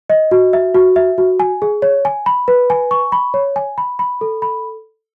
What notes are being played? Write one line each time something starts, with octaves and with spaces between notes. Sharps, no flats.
D#5
F#4
E5
F#4
E5
F#4
G#5
G#4
C#5
G#5
B5
B4
G#5
C#6
B5
C#5
G#5
B5
B5
A4
B5